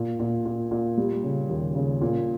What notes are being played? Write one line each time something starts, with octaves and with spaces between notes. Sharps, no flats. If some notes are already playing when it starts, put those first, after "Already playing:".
Already playing: A#2
A#2
A#2
A#2
G3
C#3
D#2
C#3
A#2